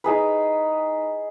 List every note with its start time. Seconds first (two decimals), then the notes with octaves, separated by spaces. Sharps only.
0.04 D#4 G#4 B4